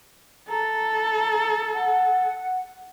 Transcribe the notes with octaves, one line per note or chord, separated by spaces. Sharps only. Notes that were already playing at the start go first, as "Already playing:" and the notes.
A4 A#5
F#5